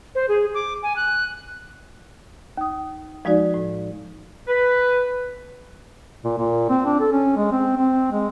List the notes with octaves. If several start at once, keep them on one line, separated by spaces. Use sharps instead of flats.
C5
G#4
D6
G#5
F#6
D#2 D#6
F3 G#3 D#4 F#4 D5
A2
B4
A#2
A#2
C4
D4
A4
C#4
G#3
C4
C4
G#3